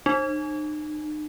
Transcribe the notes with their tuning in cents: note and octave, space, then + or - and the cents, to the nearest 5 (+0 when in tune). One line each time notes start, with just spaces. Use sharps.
D#4 -40